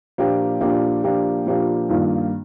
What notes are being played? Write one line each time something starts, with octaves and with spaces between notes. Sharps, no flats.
A#2 F3 A#3 D4 G4
A#2 F3 A#3 D4 G4
A#2 F3 A#3 D4 G4
A#2 F3 A#3 D4 G4
G2 D#3 A#3 F4